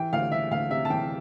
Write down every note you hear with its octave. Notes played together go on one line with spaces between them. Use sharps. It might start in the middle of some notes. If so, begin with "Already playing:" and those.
Already playing: E3 G5
D2 F5
E3 E5
D2 F5
C3 E5
A5
E3 G5